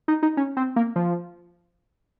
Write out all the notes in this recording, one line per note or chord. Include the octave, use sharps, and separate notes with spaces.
D#4
D#4
C#4
C4
A#3
F3